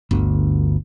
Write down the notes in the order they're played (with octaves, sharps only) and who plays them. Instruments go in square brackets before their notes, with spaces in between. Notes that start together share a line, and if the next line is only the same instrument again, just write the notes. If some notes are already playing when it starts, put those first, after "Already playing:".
[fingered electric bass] G1 D2